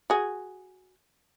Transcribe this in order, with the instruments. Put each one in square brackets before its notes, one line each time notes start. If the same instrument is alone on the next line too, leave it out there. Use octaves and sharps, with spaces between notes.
[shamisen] F#4 G#4